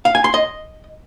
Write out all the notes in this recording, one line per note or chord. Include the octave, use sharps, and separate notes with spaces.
F5
G#5
C6
D#5